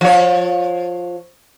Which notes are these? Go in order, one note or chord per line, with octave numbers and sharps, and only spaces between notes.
F3 C#5